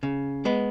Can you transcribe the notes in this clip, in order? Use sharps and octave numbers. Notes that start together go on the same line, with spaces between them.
C#3
G#3 B3